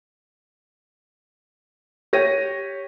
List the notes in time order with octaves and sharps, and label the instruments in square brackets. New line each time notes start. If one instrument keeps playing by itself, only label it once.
[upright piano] G4 C#5 A#6 D#7